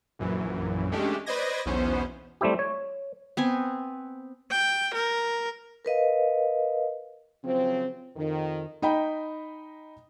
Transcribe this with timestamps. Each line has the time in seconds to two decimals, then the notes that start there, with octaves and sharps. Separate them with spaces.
0.19 A#1 F#2 E3
0.92 G#3 A3 C#4 D4 G4
1.26 B4 C5 D5 D#5 G#6 A#6
1.66 B1 E2 B3 C#4 C5
2.41 G3 A3 C4 E4 G4
2.59 C#5
3.37 B3 C4 G#5
4.51 G5
4.95 A#4
5.85 A#4 B4 D#5 F5
7.44 C#3 F3 F#3 C4
8.17 F2 D#3
8.82 D#4 D#5 G5 B5